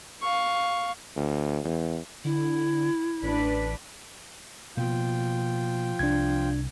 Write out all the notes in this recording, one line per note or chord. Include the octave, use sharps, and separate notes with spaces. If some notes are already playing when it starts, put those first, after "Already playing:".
F5 C#6
D2
E2
D3 E4
A1 D4 B4
B2 F3 A#3 F4 G5
C2 D4 G#6